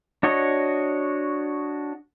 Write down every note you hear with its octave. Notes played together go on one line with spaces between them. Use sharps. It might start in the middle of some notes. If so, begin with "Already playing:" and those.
D4 F#4 C#5 D#5